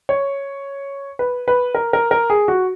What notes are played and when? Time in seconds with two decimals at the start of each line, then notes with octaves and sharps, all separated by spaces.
0.09 C#5
1.19 B4
1.48 B4
1.75 A#4
1.93 A#4
2.11 A#4
2.30 G#4
2.48 F#4